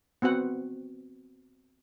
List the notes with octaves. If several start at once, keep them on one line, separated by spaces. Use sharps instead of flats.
B3 C4 F#4 F#5